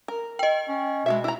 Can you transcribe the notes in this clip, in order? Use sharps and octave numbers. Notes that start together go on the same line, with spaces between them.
A#4
D#5 G5
C#4
B2 G#3 C#4 E5
E4 A#5